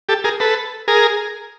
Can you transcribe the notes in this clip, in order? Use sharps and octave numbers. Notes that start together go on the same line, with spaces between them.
G4 A4
G#4 A#4
A4 B4
G#4 A#4